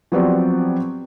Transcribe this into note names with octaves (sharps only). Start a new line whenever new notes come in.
F3 F#3 B3 C4 G4 D5